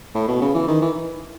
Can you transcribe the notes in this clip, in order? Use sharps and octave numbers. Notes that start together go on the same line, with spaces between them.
A2
B2
C#3
E3
D#3
E3